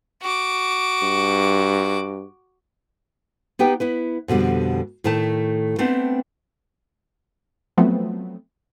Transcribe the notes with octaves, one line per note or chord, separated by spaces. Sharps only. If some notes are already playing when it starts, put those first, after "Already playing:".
F#4 D6
G2
B3 D#4 G4 B4 G5
B3 E4 B4
F2 B2 D3 G3
A2 D#3 A3 E4 A5
A3 B3 C4 D4
F3 F#3 A3 B3 C4